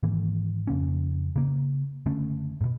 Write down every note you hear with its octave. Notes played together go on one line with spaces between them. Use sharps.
G#2 D#3 E3 A#3
F2 C#3 A#3 C#4
C#3 A#3
F#1 D3 A3 C#4
G#2 B2